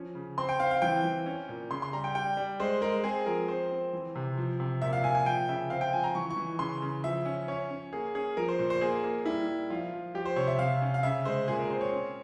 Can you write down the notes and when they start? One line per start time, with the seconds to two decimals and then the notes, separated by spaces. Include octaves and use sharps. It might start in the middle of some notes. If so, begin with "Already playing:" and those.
Already playing: F3 C#4
0.15 C#3
0.38 C4 C6
0.49 G5
0.59 C4 F5
0.71 F5
0.82 E3 G5
1.04 E3
1.26 C#4
1.49 A#2
1.70 C#3 C6
1.82 C6
1.93 G3 A#5
2.04 G5
2.15 G3 G5
2.37 G3
2.60 G#3 C5
2.82 G#3 A#4
3.04 C4 G#4
3.26 F3 A#4
3.48 C4 C5
3.71 C4
3.93 E3
4.15 C3
4.37 F3
4.60 C3
4.82 A#2 E5
4.93 F5
5.04 A#2 G#5
5.15 G#5
5.26 F3 G5
5.49 C#3 E5
5.70 C4 F5
5.81 G5
5.92 F3 G#5
6.04 A#5
6.15 E3 C#6
6.30 C#6
6.37 E3
6.59 C#3 C6
6.82 C#3
7.04 F3 E5
7.25 C#4
7.48 C#4 C#5
7.71 C#4
7.93 A#3 G#4
8.15 C#4 G#4
8.37 F3 A#4
8.48 C5
8.59 A#2
8.70 C5
8.81 A#3 G#4
9.04 A#3
9.26 G3 E4
9.48 G3
9.70 F3 F4
9.93 F3
10.14 F3 G4
10.26 C5
10.36 C3 C#5
10.48 E5
10.59 C3 F5
10.82 C#4
10.94 F5
11.03 C#3 E5
11.25 G#3 C5
11.48 A#2 G#4
11.59 A#4
11.70 C4 C5
11.81 C#5
11.92 C#4